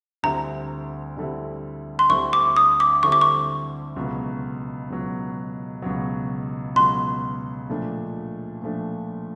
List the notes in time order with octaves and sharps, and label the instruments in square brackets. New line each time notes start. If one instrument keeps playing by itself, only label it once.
[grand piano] D2 D3 G3 C4 E4 [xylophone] A#5
[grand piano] D2 D3 G3 C4 E4
[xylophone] C6
[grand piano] D2 D3 G3 C4 E4 [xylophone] C#6
[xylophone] D6
D#6
D6
[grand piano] D2 D3 G3 C4 E4 [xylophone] C#6
[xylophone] D6
C#6
[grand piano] C#2 B2 F#3
C#2 B2 F#3
C#2 B2 F#3
[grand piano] C#2 B2 F#3 [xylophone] C6
[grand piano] A#2 F3 A3 D4
A#2 F3 A3 D4